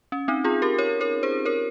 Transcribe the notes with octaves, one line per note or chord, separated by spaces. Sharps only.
C#4
C4 D#4
F4 G#4
G4 A#4
A#4 C#5
A#4 C#5
G#4 C5
A#4 C#5